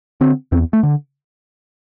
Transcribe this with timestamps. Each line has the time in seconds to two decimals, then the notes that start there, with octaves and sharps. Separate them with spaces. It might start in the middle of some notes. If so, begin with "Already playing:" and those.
0.21 D3 C4
0.52 E2 C4
0.73 A3
0.83 D3